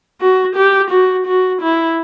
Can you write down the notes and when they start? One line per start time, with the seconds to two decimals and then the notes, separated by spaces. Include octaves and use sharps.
0.21 F#4
0.56 G4
0.91 F#4
1.27 F#4
1.62 E4